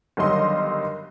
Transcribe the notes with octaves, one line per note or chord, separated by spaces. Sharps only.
G1 D#3 F#3 G3 D#5 C6